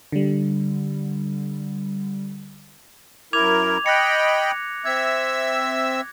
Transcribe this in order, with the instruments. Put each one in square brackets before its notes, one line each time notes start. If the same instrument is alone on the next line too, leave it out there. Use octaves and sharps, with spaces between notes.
[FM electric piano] D3 G3
[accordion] F#2 E4 A#4 [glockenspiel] D6 G#6 F7
[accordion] D#5 G5 B5 [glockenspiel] F#6 A#6 C#7
[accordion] C4 E5 E6 [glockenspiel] G#6